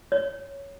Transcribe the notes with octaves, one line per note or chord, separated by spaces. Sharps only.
C#5